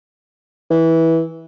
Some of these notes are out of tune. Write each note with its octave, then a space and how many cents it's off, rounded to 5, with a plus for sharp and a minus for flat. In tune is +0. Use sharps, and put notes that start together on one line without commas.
E3 -15